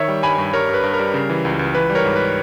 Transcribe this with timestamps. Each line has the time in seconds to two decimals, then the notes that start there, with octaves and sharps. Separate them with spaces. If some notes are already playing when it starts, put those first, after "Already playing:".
Already playing: D#3 C#5 E5
0.08 G3
0.23 G2 G#5 B5
0.38 G2
0.53 G3 A#4 C#5
0.69 G2
0.74 B4
0.83 G2
0.94 A#4
0.99 G3
1.14 C#3
1.30 E3
1.45 C#2
1.59 C#2
1.74 E3 B4
1.90 G3
1.95 A#4 C#5
2.05 G#2
2.16 B4